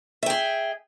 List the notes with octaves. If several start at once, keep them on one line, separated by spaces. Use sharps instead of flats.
G#4 E5 G5